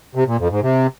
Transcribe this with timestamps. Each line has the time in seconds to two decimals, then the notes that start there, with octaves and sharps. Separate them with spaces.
0.15 C3
0.27 A#2
0.39 F2
0.50 G#2
0.62 C3